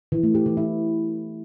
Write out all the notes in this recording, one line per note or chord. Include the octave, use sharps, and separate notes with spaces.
E3
A3
G4
E3
E4